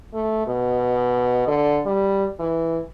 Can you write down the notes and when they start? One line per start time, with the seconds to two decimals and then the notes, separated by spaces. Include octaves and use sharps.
0.13 A3
0.47 B2
1.47 D3
1.85 G3
2.39 E3